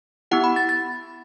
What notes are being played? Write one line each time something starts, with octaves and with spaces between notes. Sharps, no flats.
B3 E4 G4 F#5
B5
A6
A6